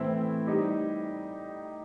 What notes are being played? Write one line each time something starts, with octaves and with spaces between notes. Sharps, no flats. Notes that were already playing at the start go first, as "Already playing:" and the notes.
Already playing: A2 E3 A3 C4 E4
G3 D#4 G4